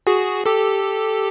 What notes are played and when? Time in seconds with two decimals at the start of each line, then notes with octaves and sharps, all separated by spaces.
0.07 F#4 G#4
0.46 G4 A4